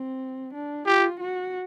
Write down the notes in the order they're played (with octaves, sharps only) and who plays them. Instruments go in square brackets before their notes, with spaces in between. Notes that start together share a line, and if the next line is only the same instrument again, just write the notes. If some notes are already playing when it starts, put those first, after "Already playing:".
Already playing: [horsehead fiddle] C4
D4
[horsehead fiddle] F4 [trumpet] G4
[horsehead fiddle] F#4